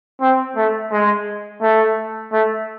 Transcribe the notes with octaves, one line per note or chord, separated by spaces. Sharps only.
C4
A3
G#3
A3
A3